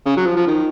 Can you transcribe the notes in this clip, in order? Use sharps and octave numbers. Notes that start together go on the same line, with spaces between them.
C#3
F#3
F3
F3
D#3